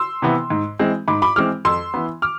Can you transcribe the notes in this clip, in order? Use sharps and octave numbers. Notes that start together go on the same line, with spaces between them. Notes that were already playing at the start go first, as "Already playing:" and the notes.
Already playing: C6 E6
C3 E3 B3
G#2
E3 G#3 C4
G#2 B5 D6
B5 D6
E3 G#3 C4 D6 F6
F2 C6 E6
E3 B3
D6 F6